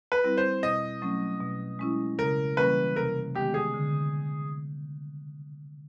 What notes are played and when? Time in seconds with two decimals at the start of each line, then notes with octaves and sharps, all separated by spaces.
0.12 B4
0.24 G3 C4 E4
0.38 C5
0.63 B2 D#5
1.02 F#3 A3 C#4
1.41 B2
1.79 G#3 C#4 E4
2.18 C#3 A#4
2.57 E3 G3 A#3 C#4 B4
2.96 C3 A#4
3.35 D#3 G#3 B3 G4
3.54 G#4
3.74 D3